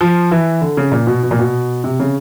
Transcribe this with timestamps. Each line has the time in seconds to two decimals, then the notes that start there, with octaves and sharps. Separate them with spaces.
0.01 F3
0.31 E3
0.62 D3
0.77 C#3
0.92 A#2
1.07 B2
1.23 B2
1.31 A#2
1.39 B2
1.84 C3
2.00 C#3